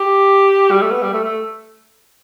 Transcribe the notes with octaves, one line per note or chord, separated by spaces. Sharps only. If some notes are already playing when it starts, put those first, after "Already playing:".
Already playing: G4
G3
A3
B3
G3
A3
A3